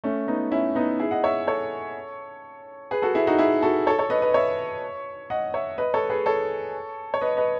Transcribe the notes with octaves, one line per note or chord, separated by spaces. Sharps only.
A3 C#4
B3 D#4
C#4 E4
B3 D#4
E4 G#4
D#5 F#5
C#5 E5
A4 C#5
G#4 B4
F#4 A4
E4 G#4
D#4 F#4
E4 G#4
F#4 A4
A4 C#5
A4 C#5
B4 D#5
B4 D#5
C#5 E5
D#5 F#5
C#5 E5
B4 D#5
A4 C#5
G#4 B4
A4 C#5
C#5
B4 D#5
B4 D#5